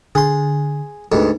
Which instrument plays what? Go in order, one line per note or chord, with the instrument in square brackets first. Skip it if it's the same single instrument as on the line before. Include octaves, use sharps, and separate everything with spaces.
[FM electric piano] D3 [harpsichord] G#4 C6
[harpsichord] D2 G#2 [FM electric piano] G4 B4